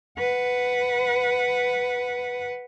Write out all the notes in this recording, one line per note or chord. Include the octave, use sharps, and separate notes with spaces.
B4 F#5